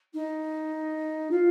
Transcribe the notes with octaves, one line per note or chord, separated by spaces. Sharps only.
D#4
F4